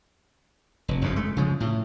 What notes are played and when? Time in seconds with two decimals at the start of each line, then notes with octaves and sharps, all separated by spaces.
0.88 F1
1.02 F1 F#2 C#3
1.16 G#3 A3
1.37 C#3 F3 G#3
1.60 A2